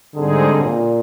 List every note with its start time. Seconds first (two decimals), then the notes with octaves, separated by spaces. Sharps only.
0.15 G#2 D3 G3 C4 D#4 G#4
0.63 A#2